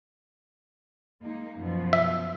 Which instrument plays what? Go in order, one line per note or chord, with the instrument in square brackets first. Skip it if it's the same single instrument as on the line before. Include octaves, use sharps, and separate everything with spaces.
[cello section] G#3 A#3 D#4
F#2 B2 F3
[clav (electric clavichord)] E5